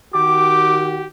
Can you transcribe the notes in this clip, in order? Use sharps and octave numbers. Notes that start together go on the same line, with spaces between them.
D#3 F#4 G4 D6